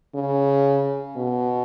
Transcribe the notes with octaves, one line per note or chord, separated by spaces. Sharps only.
C#3
B2